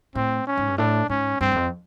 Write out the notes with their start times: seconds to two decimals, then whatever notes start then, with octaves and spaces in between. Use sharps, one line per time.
0.15 A2 C4
0.47 C#4
0.57 G#2
0.68 G2
0.78 A2 D4
1.09 G#2 C#4
1.41 G2 C4
1.52 E2
1.56 F2